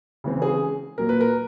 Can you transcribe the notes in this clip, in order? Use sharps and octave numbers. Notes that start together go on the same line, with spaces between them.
C#3 E3 G#3 C4
G#4
A#2 F#3 A#3 A#4
B4
A#4